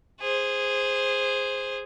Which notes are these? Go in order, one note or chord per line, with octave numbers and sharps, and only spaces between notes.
G#4 C5